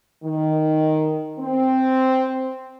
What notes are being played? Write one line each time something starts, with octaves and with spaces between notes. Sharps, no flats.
D#3
C4